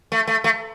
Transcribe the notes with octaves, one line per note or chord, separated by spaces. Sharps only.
A3
A3
A3